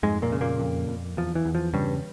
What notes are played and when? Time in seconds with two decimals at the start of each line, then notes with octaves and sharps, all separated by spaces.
0.03 F2 G#2 G#3
0.22 A#2 A#3
0.32 C#3
0.41 A#2 A#3
0.60 F2
0.88 F2
1.17 E2 F3
1.35 E3
1.45 E2
1.55 F3
1.74 G2 C#3 G3